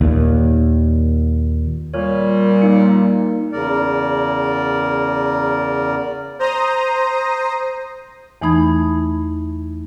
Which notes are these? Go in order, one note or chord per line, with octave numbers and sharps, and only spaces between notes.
D#2 A#2
A#2 G3 C#5 F6
A#3 D#4 C#7
E2 C#3 A#4 D5
C5 A#5 D#6
E2 E3 A3 D#4 B5 G#6